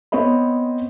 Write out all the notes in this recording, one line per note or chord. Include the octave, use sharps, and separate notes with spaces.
B3 C4 C#5 D#5 B5